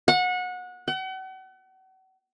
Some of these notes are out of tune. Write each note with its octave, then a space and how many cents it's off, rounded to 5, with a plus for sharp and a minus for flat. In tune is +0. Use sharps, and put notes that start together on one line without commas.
F#5 -25
F#5 +40